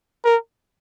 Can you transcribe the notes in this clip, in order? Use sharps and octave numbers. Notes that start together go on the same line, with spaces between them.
A#4